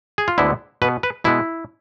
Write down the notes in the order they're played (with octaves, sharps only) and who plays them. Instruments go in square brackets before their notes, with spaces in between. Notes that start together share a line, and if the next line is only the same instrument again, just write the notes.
[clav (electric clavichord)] G#4
F4
D2 D3 G#3 B3 E4
B2 B4
B3
B4
B2 G#3 B3 E4